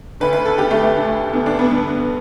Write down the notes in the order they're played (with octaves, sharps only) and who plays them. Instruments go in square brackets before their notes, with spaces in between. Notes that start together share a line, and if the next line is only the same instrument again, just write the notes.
[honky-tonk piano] D2 D3 B4
B4
A4
D2 D3 G4
A3
A3
D2 D3
D2 D3 B3
D4
B3
G2 D3